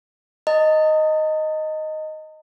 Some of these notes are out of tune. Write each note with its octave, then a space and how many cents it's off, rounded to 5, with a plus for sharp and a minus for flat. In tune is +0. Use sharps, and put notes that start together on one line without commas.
D#5 +0 A#5 -45